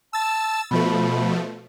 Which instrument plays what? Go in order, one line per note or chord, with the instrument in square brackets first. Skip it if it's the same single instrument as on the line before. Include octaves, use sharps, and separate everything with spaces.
[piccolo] A5 [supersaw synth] E6 A6
[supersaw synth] B2 F3 A3 [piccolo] B5